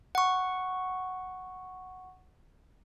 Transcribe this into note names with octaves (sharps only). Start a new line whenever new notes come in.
F#5 C#6